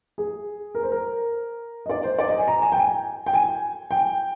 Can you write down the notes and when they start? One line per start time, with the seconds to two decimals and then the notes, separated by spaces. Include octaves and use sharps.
0.18 G#4
0.75 A#4
0.83 C5
0.92 A#4
1.86 D#5
1.90 D5
2.04 C5
2.18 D5
2.28 D#5
2.38 G#5
2.48 A#5
2.62 G#5
2.72 G5
2.77 G#5
3.26 G5
3.34 G#5
3.91 G5